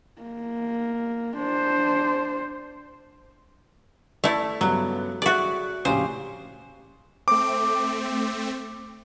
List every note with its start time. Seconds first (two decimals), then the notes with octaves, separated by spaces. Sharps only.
0.22 A#3
1.37 D4 C5
4.24 A3 E4 D5 E6
4.61 G2 C#3 F#3 B3
5.22 F#4 G#4 D5 E5
5.85 A#1 A2 C#3 G4 C5
7.28 A3 C4 D6